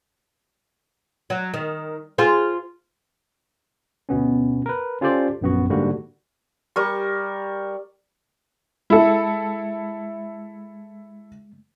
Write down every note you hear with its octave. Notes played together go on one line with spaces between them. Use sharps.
F#3
D#3
F4 G#4 C5
D2 B2 B3 C#4
A#4 B4
C#4 F4 G4 A4 C5 D5
A#1 F#2 B3 F#4
G#2 D3 G3 A#3 F#4
G3 A#4 C#6
G#3 E4 A4 E6